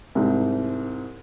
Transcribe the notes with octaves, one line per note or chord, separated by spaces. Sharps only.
C2 G#2